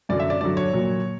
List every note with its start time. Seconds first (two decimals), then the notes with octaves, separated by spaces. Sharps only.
0.09 F#2 D3 F#3 D5
0.20 E5
0.30 D5
0.41 G2 D3 F#3 D5
0.57 C#5
0.73 A#2 F#3